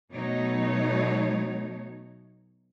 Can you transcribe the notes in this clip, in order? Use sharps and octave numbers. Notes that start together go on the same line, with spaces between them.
B2 F#3 A3 D#4 C#5